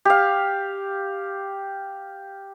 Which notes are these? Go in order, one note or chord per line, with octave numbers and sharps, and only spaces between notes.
G4 F5